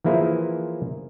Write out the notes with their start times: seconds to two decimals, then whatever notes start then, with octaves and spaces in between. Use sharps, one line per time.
0.04 E3 F3 A#3 E4 G#4 C5